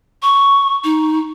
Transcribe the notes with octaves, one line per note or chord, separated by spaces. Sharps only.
C#6
D#4